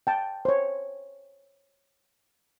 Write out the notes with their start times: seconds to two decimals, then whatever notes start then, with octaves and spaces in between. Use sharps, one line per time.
0.07 G5 A5
0.45 C5 C#5